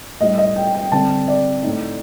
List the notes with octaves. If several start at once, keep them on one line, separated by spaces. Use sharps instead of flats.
A2 G3 D4 D#5
D#5
G5
G5
D3 G3 C4 A5
D5
A2 A3 D#4